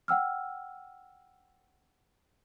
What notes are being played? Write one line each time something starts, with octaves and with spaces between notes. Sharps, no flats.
F#5 G5 E6 F6